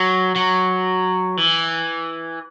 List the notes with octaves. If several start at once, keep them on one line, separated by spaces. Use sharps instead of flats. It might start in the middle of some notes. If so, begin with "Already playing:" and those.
Already playing: F#3
F#3
E3